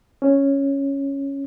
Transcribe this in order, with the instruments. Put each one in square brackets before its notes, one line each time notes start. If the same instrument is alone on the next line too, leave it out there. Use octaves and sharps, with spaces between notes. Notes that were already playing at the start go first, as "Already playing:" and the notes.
[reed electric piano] C#4